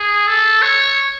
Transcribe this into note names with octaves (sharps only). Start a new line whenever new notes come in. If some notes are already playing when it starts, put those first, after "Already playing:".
Already playing: G#4
A4
C#5